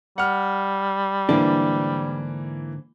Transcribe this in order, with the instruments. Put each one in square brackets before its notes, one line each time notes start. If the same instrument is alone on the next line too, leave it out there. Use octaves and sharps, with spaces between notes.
[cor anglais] G3 [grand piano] F#5 F6
[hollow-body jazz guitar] G#2 D3 D4 [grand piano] E3 A#3